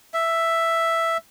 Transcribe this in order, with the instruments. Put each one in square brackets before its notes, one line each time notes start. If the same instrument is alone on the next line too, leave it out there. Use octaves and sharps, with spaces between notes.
[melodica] E5